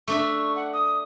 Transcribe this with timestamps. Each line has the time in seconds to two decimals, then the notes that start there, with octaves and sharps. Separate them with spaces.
0.08 A3 D4 E5 C#6
0.56 F#5
0.73 D#6